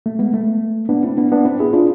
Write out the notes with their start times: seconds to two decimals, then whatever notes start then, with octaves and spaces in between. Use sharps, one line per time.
0.06 A3
0.19 G#3 B3
0.34 A3
0.89 B3 D4
1.03 C4 E4
1.17 B3 D4
1.31 B3 D4
1.45 C4 E4
1.60 E4 G#4
1.73 D4 F4